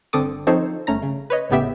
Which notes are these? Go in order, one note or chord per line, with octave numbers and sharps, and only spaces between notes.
G1 D3 C4 A4 D6 D#6
F3 C4 D#4 A4 C5 C#5
G1 A3 C#4 A#5 A#6
C#3
B4 C#5 D#5
G#1 A2 C#3 B3 G4 E5